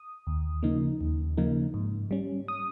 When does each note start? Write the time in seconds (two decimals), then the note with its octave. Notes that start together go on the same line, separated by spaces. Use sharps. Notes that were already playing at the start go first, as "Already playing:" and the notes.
Already playing: D#6
0.27 D#2
0.63 C#3 F3 A#3 D#4
1.01 D#2
1.37 C#3 F3 A#3 D#4
1.74 G#2
2.11 G3 C#4
2.48 D#6